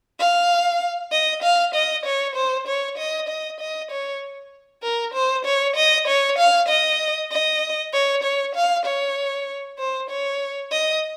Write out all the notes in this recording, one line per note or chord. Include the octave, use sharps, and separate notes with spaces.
F5
D#5
F5
D#5
C#5
C5
C#5
D#5
D#5
D#5
C#5
A#4
C5
C#5
D#5
C#5
F5
D#5
D#5
C#5
C#5
F5
C#5
C5
C#5
D#5